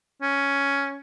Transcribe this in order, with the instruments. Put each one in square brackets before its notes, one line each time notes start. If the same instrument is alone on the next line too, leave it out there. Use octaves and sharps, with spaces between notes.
[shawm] C#4